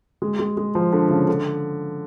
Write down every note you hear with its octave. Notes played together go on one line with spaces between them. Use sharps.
G#3
G#3
G#3
F3
D3
C#3
D3